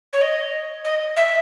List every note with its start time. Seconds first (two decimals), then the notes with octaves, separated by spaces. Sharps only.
0.12 C#5
0.21 D#5
0.84 D#5
1.16 E5